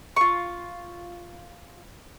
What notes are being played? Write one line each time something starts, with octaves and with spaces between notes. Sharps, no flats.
F4 C#6